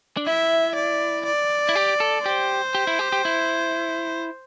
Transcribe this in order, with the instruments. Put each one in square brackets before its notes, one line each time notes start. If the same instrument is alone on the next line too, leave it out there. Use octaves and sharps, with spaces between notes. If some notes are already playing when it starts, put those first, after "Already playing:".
[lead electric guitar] D4
[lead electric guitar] E4 [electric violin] E5
[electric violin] D5
D5
[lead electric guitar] E4
G4
A4
[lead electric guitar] G4 [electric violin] C5
[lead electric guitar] G4
E4
G4
G4
E4